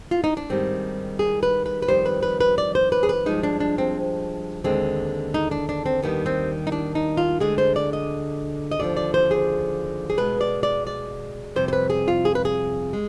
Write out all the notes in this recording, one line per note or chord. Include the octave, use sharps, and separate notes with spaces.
F4
D#4
D4
G#2 D#3 G3 C4
G#4
B4
B4
B4
F2 D#3 G3 C5
B4
B4
B4
D5
C5
B4
G#4
B4
G2 F3 G#3 D#4
D4
D4
C4
D#2 D3 G#3 C4
D#4
D4
D4
C4
D#2 D#3 G3 B3
C4
D#4
D4
D#4
F4
D2 D3 G#3 G#4
C5
D5
D#5
D#5
D#2 D3 F3 D5
D5
C5
G#4
G#4
B2 G#3 B4
D5
D5
D5
F2 C3 G3 C5
C5
B4
G#4
F4
G#4
B4
G#4
G#3